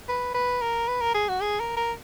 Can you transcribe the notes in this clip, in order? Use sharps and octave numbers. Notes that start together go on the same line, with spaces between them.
B4
B4
A#4
B4
A#4
G#4
F#4
G#4
A#4
A#4